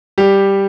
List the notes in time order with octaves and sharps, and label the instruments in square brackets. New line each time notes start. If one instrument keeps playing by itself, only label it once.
[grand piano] G3 G4